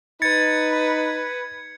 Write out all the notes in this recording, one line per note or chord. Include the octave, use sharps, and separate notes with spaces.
D#4 B4 G#6 A6 C#7